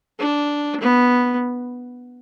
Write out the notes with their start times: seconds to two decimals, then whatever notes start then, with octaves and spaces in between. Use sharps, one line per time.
0.20 D4
0.81 B3